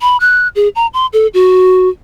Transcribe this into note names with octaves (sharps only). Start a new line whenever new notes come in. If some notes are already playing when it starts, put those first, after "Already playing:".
B5
F#6
G#4
A#5
C6
A4
F#4